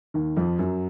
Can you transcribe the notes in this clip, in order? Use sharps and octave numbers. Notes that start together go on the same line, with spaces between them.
D#2 D#3
F2 F3
F#2 F#3